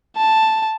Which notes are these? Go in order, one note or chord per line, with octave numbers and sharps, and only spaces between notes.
A5